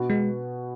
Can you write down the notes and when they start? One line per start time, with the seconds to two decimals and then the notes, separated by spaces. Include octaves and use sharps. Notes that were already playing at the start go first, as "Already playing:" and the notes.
Already playing: B2 B3 F#4
0.10 G#3